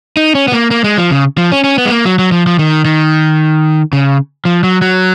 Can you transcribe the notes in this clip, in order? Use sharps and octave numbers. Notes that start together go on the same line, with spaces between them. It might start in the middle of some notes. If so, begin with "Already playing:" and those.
D#4
C#4
B3
A#3
A#3
G#3
F3
C#3
F3
C#4
C#4
B3
G#3
A#3
F#3
F#3
F3
F3
D#3
D#3
C#3
F3
F#3
F#3